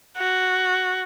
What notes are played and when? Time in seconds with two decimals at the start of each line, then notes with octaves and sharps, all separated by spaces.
0.18 F#4